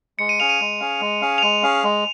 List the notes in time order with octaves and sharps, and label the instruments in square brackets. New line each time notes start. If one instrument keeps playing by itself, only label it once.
[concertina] G#3 [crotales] C#7
[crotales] D#7
[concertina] C#4 G#4 F5 [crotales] F7
[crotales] D#7
[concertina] G#3
C#4 G#4 F5
G#3
C#4 G#4 F5
[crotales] F7
[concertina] G#3 [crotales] D#7
[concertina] C#4 G#4 F5
G#3